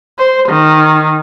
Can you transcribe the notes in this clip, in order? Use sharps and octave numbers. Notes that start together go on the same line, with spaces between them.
C5
D#3